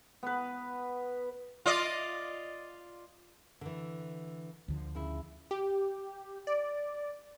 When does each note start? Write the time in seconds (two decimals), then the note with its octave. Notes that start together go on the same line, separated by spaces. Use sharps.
0.23 B3 B4
1.66 F4 D5 D#5
3.61 D3 E3
4.68 D2 D3 F3
4.95 C#3 E4
5.51 G4
6.47 D5